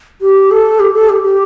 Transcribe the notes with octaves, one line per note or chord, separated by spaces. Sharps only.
G4
A4
G4
A4
G4
G4